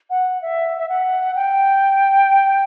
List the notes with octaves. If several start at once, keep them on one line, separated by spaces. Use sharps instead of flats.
F#5
E5
E5
F#5
G5